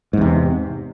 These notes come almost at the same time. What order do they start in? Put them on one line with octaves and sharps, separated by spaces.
G#2 E2 C3